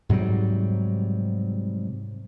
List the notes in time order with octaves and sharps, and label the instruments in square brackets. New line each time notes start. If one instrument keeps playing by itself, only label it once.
[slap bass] G#2 C3 F#3 G3